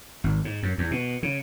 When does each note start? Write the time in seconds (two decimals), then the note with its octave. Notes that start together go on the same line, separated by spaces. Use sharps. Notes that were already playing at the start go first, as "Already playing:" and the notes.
0.24 G#1
0.45 G#2
0.63 F#2
0.78 E2
0.91 B2
1.23 C#3